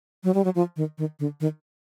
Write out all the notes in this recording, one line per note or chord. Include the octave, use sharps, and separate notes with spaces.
F#3
G3
F#3
F3
D#3
D#3
D3
D#3